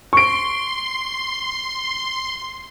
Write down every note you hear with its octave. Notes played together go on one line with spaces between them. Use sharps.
C6 C#6 D7